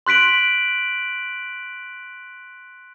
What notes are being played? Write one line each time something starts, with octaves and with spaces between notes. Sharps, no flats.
C6 F#6 B6 D7 F#7